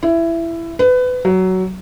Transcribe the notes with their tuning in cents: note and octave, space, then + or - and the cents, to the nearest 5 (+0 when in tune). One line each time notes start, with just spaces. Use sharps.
E4 +15
B4 +25
F#3 +15